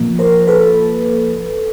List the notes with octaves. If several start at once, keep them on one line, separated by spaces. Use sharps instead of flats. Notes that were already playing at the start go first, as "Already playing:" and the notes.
Already playing: A#2 F3 A#3
A#4 C5
A4 B4